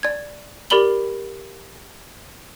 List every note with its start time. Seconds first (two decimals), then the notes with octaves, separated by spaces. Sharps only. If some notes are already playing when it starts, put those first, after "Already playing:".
0.03 D5 G#6
0.70 G4 A#4 D5 B5 F#7 G7